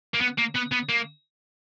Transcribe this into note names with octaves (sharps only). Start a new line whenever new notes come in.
A#3
B3
A#3
B3
B3
A#3